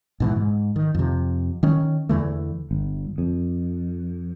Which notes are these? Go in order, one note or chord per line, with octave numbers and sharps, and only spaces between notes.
G#2 B2 E3
G#2
D#3
F2 C3
D#3 C#4
E2 D3 E3 A3
G1
F2